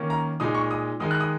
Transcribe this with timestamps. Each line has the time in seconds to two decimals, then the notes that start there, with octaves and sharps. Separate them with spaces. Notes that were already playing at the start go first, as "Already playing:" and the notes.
Already playing: D#3 A#3 C#4
0.10 A#5
0.40 A#2 G#3 D#4 D#6
0.55 C#6
0.71 D#6
1.00 D#3 G#3 D#4 D#6
1.11 F#6
1.20 D#6